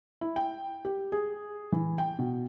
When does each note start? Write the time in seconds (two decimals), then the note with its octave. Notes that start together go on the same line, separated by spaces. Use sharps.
0.21 E4
0.36 G5
0.85 G4
1.12 G#4
1.72 E3
1.98 G5
2.19 B2